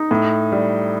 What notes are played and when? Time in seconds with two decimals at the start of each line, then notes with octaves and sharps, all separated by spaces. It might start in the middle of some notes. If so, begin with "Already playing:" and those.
Already playing: D#4
0.11 A2
0.52 G3